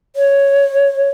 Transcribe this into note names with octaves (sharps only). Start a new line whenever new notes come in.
C#5